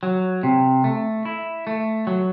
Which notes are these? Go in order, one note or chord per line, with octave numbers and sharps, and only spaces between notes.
F#3
C3
A3
E4
A3
F#3